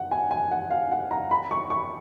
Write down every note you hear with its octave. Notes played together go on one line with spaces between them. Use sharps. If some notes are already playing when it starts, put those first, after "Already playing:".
Already playing: F#5
G#5
G#5
F#5
F5
F#5
A#5
B5
C#6
C#6